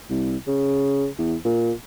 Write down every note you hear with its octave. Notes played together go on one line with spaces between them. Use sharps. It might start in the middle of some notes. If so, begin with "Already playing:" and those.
C2
C#3
E2
A#2